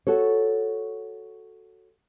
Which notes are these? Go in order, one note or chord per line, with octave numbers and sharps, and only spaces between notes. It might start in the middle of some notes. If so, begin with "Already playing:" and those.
F#4 A4 C#5